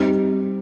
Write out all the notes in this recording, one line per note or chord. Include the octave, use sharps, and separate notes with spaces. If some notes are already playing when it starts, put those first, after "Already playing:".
Already playing: G3 C4 D#4 G4